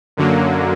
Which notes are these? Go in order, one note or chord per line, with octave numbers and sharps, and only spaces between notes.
F#2 D3 F#3 A#3